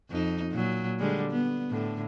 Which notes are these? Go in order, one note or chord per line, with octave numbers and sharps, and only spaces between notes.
F2 D#4
A#2 F#3
D3 G3 G#3
B3
A2 D3